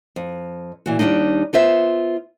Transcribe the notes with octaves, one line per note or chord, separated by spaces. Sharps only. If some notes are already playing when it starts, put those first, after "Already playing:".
F2
A#2 E3 F#4
D#2 G3 G#3 D4 D#4
B3 F4 C5 E5